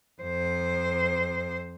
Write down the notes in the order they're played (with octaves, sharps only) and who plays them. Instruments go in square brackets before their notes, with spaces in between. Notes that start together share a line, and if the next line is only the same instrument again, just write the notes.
[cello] F2 C5